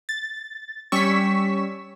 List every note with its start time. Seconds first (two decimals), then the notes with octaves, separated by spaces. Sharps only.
0.09 A6
0.92 G3 C#4 C#6 E6 B6